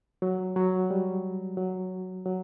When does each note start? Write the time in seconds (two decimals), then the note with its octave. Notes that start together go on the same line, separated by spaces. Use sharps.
0.22 F#3
0.56 F#3
0.91 G3
1.57 F#3
2.26 F#3